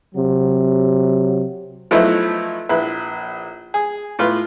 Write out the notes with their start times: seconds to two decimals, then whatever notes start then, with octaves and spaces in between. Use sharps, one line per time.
0.14 C3 F#3
1.91 F3 F#3 A3 B3 D#4 E4
2.69 A#1 E4 B4
3.74 G#4
4.19 A2 F4 B4